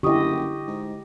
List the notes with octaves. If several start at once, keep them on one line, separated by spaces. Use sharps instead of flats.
F#1 D3 E4 G4 D#5 C#6 D#6
G#2